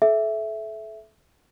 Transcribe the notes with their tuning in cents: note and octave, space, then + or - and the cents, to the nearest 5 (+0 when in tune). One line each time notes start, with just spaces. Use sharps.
A4 -35 E5 +0